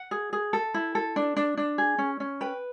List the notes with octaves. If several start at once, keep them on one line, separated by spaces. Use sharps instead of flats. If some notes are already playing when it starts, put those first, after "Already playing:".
Already playing: F#5
G#4
G#4
A4
E4
A4
D4
D4
D4
G#4
C#4
C#4
B4 G5